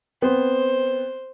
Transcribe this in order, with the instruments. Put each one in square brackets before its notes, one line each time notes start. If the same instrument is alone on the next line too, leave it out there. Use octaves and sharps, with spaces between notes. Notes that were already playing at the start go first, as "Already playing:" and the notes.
[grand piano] B3 C4 [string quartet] C5